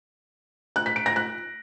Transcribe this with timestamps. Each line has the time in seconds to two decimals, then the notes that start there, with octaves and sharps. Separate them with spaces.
0.76 F#6
0.86 B6
0.96 D7
1.06 A#6
1.16 F#6